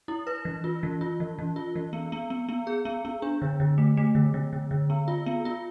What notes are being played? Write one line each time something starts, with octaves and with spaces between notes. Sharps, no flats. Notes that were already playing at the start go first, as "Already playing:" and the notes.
E4
B4
E3
F4
E3
F4
E3
E3
F4
E3
B3
B3
B3
B3
G#4
B3
B3
D4
D3
D3
A3
A3
D3
D3
D3
D3
B3
F4
B3
F4